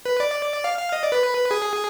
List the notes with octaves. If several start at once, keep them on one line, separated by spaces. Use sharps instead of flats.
B4
D5
F5
F5
D#5
D5
B4
G#4